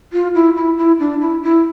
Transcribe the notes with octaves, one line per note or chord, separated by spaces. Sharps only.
F4
E4
E4
E4
D4
E4
E4